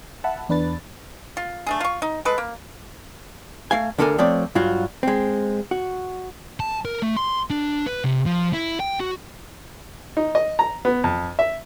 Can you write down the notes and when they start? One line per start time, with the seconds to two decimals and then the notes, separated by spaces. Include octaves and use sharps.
0.24 E5 F#5 A5 B5
0.49 E2 D4 B4 A6
1.37 F4
1.67 A3 D4 G#4
1.80 F4 C#6
2.02 D#4
2.25 G#3 A4 B4
2.38 A#3
3.71 A3 F5 G#5
3.98 D2 D4 A4 A#4 G#5
4.18 F3 A3 C4 C#5 D5
4.55 G2 F#3 F4 F#4
5.03 G#3 C4
5.71 F#4
6.60 A5
6.85 A#4
7.02 A3
7.17 C6
7.50 D4
7.86 B4
8.04 C3
8.26 F3
8.53 E4
8.80 G5
9.00 F#4
10.17 D#4
10.35 D#5
10.59 A#5
10.85 B3
11.04 F2
11.39 E5